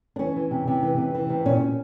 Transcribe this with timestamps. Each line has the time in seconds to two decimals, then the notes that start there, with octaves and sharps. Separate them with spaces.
0.16 D4
0.19 E3 C#4
0.36 E3
0.51 C3
0.68 C3
0.83 E3
0.98 C3
1.15 E3
1.30 C3
1.45 A#2 C#4
1.61 A#2